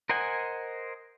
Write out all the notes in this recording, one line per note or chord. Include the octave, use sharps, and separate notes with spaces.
A#4 C5 D#5 F#5 G#5